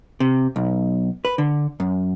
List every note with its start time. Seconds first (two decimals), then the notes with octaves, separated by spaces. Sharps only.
0.20 C3
0.56 B1
1.25 B4
1.38 D3
1.80 F#2